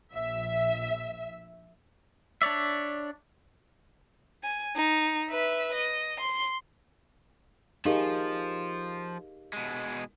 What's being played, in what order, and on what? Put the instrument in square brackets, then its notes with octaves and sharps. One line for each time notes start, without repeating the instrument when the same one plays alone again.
[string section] A#1 E5
[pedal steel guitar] D4 C#5 D5 E5
[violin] G#5
D#4
B4 E5
D#5
C6
[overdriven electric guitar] F3 [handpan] D#4 G#4 A#4 [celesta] G4 D#5 F5
[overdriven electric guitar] B2 G#3